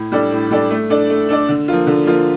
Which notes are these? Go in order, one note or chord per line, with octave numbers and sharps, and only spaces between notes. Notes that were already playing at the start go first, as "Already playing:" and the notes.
Already playing: A2
G3 D4 A4 D5
A2
G3 D4 A4 D5
A3
D4 A4 D5
A3
D4 A4 D5
D3
F3 A#3 F4
D3
F3 A#3 F4